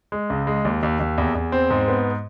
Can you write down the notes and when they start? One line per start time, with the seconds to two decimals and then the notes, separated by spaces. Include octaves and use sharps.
0.12 G#3
0.30 C#2
0.47 G#3
0.65 D#2
0.83 D#2
1.00 D#2
1.18 E2
1.35 E2
1.52 C4
1.70 G#2
1.88 B3